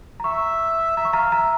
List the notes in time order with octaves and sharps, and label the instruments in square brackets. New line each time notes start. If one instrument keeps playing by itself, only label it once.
[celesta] A#5
[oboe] E5 [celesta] C#6
[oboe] E5 [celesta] A#5
[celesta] C#6
[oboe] F5 [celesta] A#5
[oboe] E5 [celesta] A#5